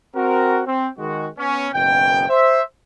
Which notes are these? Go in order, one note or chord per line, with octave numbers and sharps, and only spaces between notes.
C4 F#4 A#4
C4
D#3 G#3 F#4
B3 C#4
F#1 B2 D#3 C#4 G5
C5 E5